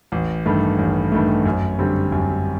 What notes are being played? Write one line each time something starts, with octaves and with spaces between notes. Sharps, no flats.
A1
G2 D#3 A3
A1
G2 D#3 A3
F#2
D3 G3 C4
F#2